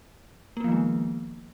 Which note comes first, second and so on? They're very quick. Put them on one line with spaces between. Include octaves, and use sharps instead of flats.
A#3 B3 F3 D#3 G#3